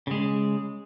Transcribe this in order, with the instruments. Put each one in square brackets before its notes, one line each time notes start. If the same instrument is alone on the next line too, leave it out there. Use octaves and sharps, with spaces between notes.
[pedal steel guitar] C#3 G#3